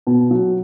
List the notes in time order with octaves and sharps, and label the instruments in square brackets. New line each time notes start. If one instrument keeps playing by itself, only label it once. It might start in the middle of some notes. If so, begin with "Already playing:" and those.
[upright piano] B2
F#3